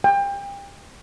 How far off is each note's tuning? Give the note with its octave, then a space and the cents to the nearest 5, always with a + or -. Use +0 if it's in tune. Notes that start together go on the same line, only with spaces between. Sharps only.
G5 +30